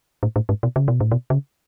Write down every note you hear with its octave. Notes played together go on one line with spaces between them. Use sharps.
A2
A2
G#2
B2
C#3
B2
A2
B2
C#3